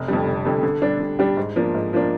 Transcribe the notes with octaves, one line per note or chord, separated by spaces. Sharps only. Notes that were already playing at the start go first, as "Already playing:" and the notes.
Already playing: F1
F2 D3 G3
F1
F2 D3 G3
D3
G3 D4 G4
D3
G3 D4 G4
G#2
F3 A#3 D4
G#2
F3 A#3 D4